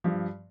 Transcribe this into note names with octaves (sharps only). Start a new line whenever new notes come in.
G2 F3